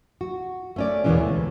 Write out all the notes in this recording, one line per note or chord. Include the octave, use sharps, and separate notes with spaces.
F#4
A3 C#4 D5
D#2 B2 D3 E3 G#3 C#4
D2